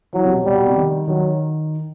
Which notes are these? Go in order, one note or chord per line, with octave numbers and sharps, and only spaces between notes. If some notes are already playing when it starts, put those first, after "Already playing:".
E3 F#3
C3
B2
B2 G3
B2
C3
D#3
D#3 F#3